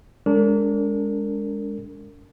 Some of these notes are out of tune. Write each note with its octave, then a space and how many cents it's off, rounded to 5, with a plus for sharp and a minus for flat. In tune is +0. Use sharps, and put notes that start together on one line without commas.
G#3 -10 D4 -35 A#4 -30